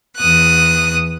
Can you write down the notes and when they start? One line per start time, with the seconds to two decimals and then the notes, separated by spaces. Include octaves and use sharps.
0.16 E2 D#6 F#6